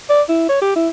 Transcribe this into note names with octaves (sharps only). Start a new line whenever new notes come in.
D5
E4
C#5
G4
E4